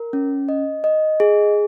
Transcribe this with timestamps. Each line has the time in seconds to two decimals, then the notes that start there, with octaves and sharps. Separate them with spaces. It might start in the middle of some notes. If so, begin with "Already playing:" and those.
Already playing: A#4
0.13 C#4
0.49 D#5
0.84 D#5
1.20 G#4